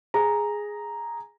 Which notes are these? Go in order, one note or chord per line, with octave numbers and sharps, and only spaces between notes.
G#4 A#5